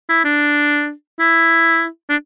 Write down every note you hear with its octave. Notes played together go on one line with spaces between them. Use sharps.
E4
D4
E4
D4